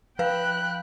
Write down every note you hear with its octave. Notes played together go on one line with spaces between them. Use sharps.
F3 B4 F5 G5 B5 F#6